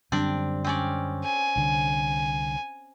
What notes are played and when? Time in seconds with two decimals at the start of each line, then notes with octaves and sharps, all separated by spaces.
0.12 F#2 D3 G3 C4 D4 D5
0.64 C4 C#4 D5
1.25 G#5
1.56 C2 D3